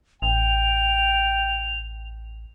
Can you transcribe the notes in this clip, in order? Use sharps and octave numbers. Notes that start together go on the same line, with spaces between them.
A1 G5 F7